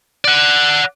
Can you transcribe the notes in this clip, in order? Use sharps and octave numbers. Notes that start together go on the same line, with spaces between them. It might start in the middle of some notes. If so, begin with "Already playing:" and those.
D5 F#5